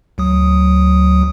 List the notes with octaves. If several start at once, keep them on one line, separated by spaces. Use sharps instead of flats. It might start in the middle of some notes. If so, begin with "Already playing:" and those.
D2 F#3 D#6